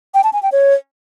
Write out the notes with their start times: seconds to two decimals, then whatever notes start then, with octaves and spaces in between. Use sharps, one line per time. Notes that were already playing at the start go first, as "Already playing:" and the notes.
0.14 G5
0.24 A5
0.33 G#5
0.43 G5
0.52 C#5